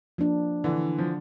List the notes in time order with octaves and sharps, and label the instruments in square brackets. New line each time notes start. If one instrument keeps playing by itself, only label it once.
[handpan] F3 A#3 D4
[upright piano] D3 E3
F3